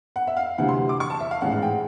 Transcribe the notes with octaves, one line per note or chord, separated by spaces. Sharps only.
F#5
E5
F5
D2 C3 E3 F#5
C6
D6
C#6
A5
E5
F5
A1 G#2 E3 G#3 F#5
F#5
G5